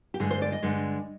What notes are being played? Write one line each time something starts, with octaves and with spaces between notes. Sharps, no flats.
G4
G2 D3 G#3 G#4
C5
D5
D#5
G2 D3 G#3